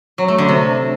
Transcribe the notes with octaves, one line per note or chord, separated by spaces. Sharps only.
F#3
A3
D3
C3